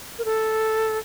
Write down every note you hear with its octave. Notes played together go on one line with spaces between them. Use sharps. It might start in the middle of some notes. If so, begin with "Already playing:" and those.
A#4
A4